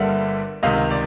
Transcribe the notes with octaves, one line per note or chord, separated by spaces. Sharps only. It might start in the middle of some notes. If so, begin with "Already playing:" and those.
Already playing: G1 G2 D3 G3 A#3 E5 F#5
C#2 C3 D#3 D#5 F5
D5